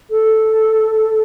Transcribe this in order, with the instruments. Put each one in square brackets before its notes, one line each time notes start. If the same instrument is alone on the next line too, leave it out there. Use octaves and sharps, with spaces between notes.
[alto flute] A4